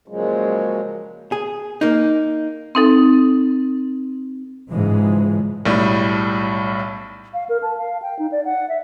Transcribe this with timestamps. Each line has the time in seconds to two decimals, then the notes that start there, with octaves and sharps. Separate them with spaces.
0.08 A#2 C#3 F3 F#3 G#3
1.32 G#4
1.81 A#3 D#4
2.75 C4 D#4 A4
4.70 G#2 C#3 E3 F3 G#3
5.65 B1 A2 G3
7.34 F5
7.49 A#4
7.62 A5
7.77 F5
8.02 G5
8.19 D#4
8.32 D5
8.45 F#5
8.69 E5